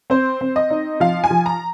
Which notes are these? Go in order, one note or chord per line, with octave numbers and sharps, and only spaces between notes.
C4 C5
C4
D#5
D#4
F3 F5
G#5
F3
A#5